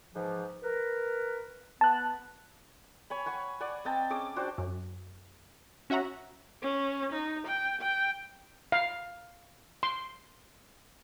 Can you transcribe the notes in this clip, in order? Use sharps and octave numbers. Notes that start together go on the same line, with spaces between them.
G#2 E3 F3
A#4 B4
B3 A5 F#6
C#5 G#5 B5
F#5 G#5 C#6
D5 F#5 G#5
C4 D#5 G5 A5
C#4 G#4 D6
D4 F#4 C5 G5
F#2
C#4 F#4 E5 F#5 A#5
C#4
D#4
G5
G5
F5
C6